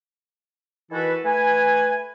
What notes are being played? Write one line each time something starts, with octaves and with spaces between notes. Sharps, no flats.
D#3 E3 E4 F#4 A4 B4
A3 B4 G#5